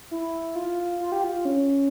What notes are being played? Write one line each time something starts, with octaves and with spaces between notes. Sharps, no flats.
E4
F4
F4
G4
F4
C#4